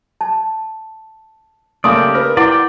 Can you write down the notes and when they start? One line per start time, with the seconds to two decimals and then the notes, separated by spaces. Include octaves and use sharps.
0.21 A5
1.84 C#3 A3 A#3 G4 D5 C6 D#6
2.15 A#4 B4
2.37 E4 D5 F#5 G5 C6